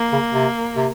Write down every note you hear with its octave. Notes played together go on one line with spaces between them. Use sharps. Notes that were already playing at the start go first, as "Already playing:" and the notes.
Already playing: A#3
C#3
C3
C3